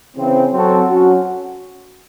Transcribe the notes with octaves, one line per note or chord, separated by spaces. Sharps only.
C#3 E3 C4
F#3 C4 F#4 A4
F#3 C#4 F#4